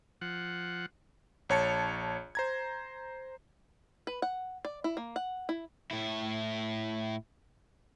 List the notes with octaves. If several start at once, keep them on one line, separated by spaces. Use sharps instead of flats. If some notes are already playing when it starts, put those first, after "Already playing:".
F3 F#5
A#1 C#5 A5 C#7
C5 A#5 G#6
B4
F#5
D5
E4
A#3
F#5
E4
A2 E4